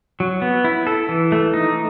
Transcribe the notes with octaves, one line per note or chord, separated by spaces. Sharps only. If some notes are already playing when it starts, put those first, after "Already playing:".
F#3
B3
E4
A4
E3
A3
D#4